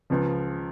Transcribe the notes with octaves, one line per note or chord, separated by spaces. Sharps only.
C#2 C#3 F3